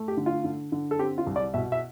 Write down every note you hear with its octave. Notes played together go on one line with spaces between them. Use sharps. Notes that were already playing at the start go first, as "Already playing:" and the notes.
Already playing: A3
G4
D3
F4
D3
D3
A4
C4 G4
F4
C2
D5
B2 E5
E5